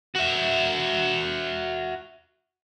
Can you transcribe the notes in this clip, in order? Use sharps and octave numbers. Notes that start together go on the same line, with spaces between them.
F#4 E5